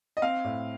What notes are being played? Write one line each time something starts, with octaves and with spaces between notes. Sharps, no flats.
D#5
C4 F5
A2